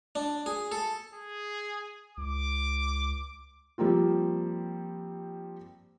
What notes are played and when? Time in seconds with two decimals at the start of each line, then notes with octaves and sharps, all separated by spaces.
0.15 D4
0.46 G#4
0.72 A4
1.14 G#4
2.17 C#2 D6
3.78 F3 G3 A#3 C4 F4